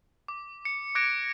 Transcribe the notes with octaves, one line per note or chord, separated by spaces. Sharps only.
D6
C#7
D6 F#6 G#6 A#6 D7